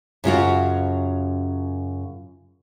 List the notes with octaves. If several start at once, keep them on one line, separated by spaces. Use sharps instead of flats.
F#2 C#3 F4 F#4